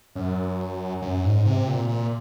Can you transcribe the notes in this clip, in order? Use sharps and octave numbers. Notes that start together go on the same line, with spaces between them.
F#2
F#2
G#2
C3
A#2
A#2